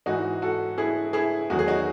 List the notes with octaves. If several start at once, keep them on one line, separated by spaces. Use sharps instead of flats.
G#2 E3 G#3 D#4 F#4
F#4 A4
E4 G#4
E4 G#4
E2 D#3 F#3 F#4
G#4
D#4 F#4